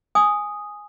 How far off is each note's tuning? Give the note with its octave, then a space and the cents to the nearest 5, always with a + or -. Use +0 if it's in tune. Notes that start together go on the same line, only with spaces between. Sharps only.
G#5 +0 D#6 +0